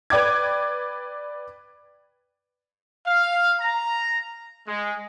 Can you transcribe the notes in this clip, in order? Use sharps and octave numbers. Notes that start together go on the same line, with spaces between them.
B4 D5 G5 D6 G#6
F5
A#5
G#3